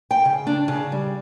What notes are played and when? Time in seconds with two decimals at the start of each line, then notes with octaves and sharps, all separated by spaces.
0.11 G5
0.25 C#3
0.47 D4
0.68 C#3
0.92 G3